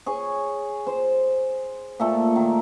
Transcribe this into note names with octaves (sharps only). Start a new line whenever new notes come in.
G#4 C#5 C#6
C5
A#2 A3 A4
D#3